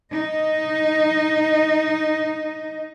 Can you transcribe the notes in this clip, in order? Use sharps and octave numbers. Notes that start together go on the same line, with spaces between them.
D#4 D#5